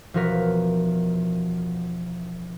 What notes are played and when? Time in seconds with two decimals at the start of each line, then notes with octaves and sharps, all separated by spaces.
0.14 E1 F3 F#4 A#4 B6